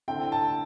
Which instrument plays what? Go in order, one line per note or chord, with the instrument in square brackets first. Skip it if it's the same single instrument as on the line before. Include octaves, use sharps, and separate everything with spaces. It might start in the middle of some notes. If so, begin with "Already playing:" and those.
[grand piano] D3 C4 E4 G5
A5